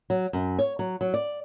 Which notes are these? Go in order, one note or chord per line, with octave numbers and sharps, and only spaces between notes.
F#3
F#2
C#5
F#3
F#3
D5